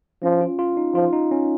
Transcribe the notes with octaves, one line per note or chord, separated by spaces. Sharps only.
F3 C#4
F4
F4
D#4
F3 F4
D#4
C#4